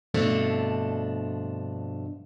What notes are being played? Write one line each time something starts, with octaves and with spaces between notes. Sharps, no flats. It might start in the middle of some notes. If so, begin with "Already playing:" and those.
G2 B2 F3 A3 C4 D4